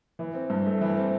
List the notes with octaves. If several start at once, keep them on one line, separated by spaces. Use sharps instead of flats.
E3
C4
G2
A3
E3
C4